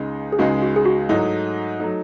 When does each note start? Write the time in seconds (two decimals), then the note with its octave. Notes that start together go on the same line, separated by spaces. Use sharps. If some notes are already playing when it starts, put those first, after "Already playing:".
Already playing: C#2 C#3 G#3 D#4
0.32 G#4
0.38 C#2 C#3 G#3 D#4 F#4
0.62 F#4
0.76 G#4
0.85 F#4
1.09 G#2 F#3 A3 D#4 E4
1.80 F#3 A3 D#4